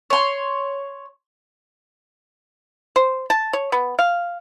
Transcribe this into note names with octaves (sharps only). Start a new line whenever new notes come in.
C#5 C6
C5
A5
C#5
B3
F5